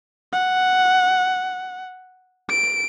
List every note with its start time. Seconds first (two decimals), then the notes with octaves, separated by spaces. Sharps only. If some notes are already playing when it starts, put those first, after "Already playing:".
0.33 F#5
2.49 D7